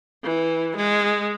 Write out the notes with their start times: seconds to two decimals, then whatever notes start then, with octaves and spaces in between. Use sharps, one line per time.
0.24 E3
0.77 G#3